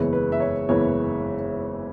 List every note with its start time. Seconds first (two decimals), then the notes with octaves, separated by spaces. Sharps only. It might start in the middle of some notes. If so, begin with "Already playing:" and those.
Already playing: F#1 E2 E3 G#3 C#5
0.13 B4
0.32 E5
0.40 C#5
0.69 F#1 E2 E3 G#3 C#5